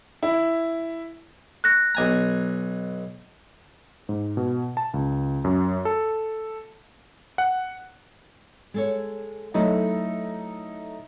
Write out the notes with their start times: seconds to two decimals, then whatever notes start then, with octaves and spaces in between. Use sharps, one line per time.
0.23 E4
1.64 F#6 A#6
1.95 B1 G#5 A#5
4.09 G#2
4.37 B2
4.77 A5
4.94 C#2
5.44 F#2
5.85 A4
7.38 F#5
8.74 G#3 A4 C#5
9.54 F#3 A3 D#4 E4 A4